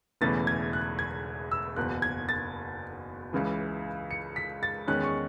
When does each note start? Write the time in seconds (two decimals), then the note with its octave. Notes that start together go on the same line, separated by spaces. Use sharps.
0.21 E1 E2 C#3 E3 A3 A6
0.47 G#6
0.73 F#6
0.99 G#6
1.51 E6
1.76 F#1 E2 B2 F#6
2.02 G#6
2.29 A6
3.33 C#2 C#3 E3
4.11 C#7
4.36 B6
4.63 A6
4.87 E2 D#3 G#3 C#4 F#6
5.04 C#6